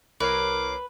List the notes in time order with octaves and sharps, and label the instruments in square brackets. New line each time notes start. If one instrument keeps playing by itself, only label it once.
[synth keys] C2 C#5 C7 [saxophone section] A#4 [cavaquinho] B4 [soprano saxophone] D6